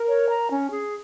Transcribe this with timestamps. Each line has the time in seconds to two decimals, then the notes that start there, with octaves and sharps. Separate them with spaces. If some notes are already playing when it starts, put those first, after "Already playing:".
Already playing: A#4
0.08 C#5
0.29 A#5
0.51 C#4
0.71 G#4